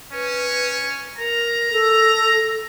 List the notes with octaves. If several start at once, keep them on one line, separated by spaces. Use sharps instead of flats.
C#4 B4
A#4 A#5
A4